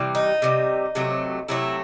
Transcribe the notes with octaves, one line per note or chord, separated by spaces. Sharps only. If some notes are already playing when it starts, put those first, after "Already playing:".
Already playing: C3 E3 G3
D#4
C3 E3 G3
C3 F#3 A3
C3 F#3 A3 E4